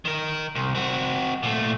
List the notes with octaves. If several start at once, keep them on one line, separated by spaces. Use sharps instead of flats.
D#3 A#4
C2
C4 F#4
A#2 A3